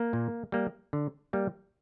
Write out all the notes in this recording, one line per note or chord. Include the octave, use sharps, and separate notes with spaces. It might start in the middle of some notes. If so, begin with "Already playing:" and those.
Already playing: A#3
A#2
G3 A#3
D3
G3 A#3